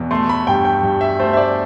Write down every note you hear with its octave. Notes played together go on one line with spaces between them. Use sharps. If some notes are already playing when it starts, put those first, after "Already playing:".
Already playing: E2 B2
A3 C6
B5
G2 G5
G5
G2
E5
A3 C5
E5
D5